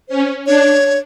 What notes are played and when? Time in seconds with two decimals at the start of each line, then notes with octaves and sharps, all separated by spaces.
0.09 C#4 C5
0.46 D4 C#5